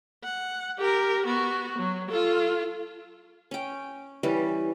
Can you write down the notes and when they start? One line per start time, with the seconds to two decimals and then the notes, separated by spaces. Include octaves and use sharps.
0.24 F#5
0.78 G4 A#4
1.25 B3 F#4
1.79 F#3
2.09 F4 A4
3.51 C#4 G5
4.23 E3 G3 C#4